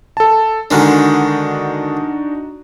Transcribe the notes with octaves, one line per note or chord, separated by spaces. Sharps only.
A4 A5
D3 D#3 G#3 D4 D#4 F#4